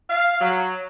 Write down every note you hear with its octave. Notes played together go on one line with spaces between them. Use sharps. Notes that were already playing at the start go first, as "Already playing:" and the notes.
F5
F#3